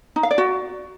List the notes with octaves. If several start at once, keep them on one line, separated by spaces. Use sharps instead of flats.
D#4
F5
D5
F#4